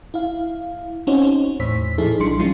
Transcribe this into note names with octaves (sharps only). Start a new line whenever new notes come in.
E4 F5
C4 C#4 D#4 F#4 C5 C#5
E2 A2 C5 B6
A#2 F3 D#4 E4 G#4 A4
B1 G3 D4 C6 C#7
F3 F#3 G#3 C#4 D#4 F4